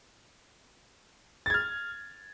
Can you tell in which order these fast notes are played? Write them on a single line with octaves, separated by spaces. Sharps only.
A6 G#6 F6